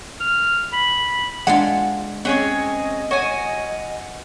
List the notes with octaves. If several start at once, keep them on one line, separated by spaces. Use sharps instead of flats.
F6
B5
G#3 D4 F4 F#5
C4 C#4 G#4 C#5 D#5 F#5
F#4 C#5 G#5